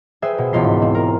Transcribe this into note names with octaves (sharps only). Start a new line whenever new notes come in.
G#4 B4 C5 E5 G5
B2
E1 C#2 B2 F4 C6 B6
G#2
C4
A#4